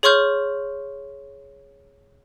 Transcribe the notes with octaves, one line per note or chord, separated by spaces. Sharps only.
G#4 C#5 C6 C#6 F6 G6